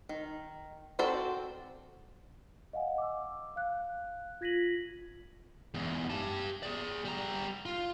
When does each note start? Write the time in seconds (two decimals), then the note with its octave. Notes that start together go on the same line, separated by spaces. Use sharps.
0.09 D#3
0.99 C4 F#4 A4 C5 D5
2.73 D#5 F5 F#5 G#5
2.98 D6 E6
3.56 F5 F#6
4.41 F4 G#6 A#6 B6 D#7 F#7
5.74 E2 G#2
6.10 G4 A5
6.63 G#4 D5
7.05 G3 A#5
7.66 F4